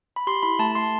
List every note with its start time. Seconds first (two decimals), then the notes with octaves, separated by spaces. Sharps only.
0.16 B5
0.27 G4 C6
0.43 E4 B5
0.59 A3 A5
0.75 A3 C6